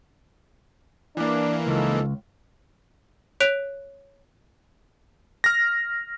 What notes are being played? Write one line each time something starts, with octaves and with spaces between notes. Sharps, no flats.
E3 A#3 D4
C#2 F3 D#4 A4
C#5 F#6 B6 D7 F7
F6 A#6